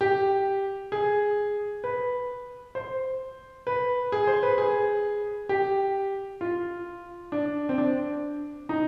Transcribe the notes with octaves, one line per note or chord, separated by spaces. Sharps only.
G4
G#4
B4
C5
B4
G#4
C5
B4
G#4
G4
F4
D4
C4
D4
D#4